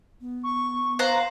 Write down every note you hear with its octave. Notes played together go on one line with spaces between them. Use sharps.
B3
C#6
C5 F5 F#5 A#5